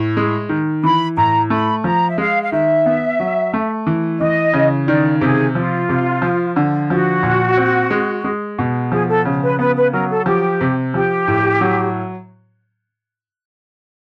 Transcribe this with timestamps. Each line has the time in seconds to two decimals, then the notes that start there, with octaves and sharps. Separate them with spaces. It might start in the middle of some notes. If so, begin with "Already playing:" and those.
Already playing: A2
0.17 G#3
0.49 D#3
0.83 E3 B5
1.17 A2 A#5
1.50 A3 B5
1.84 F3 A#5
2.09 E5
2.18 G#3 F5
2.42 F5
2.52 D#3 E5
2.86 B3
3.20 F#3
3.53 A3
3.87 E3
4.20 E3 D#5
4.53 C#3
4.88 D#3 D5
5.21 C3 G#4
5.55 F3 F4
5.89 C3
6.22 F3
6.56 D3
6.90 F3 F#4
7.23 A#2
7.57 C4
7.90 G#3
8.24 G#3
8.59 B2
8.92 F3 G#4
9.09 A4
9.25 C#3
9.43 B4
9.59 B3 B4
9.76 B4
9.92 F#3 A#4
10.09 A4
10.26 F3 G4
10.61 C3
10.94 F3 G4
11.28 A2
11.61 F#3